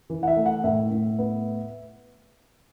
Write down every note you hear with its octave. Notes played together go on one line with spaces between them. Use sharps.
E3
F#5
E5
A3
F#5
A2 E5
A2
B3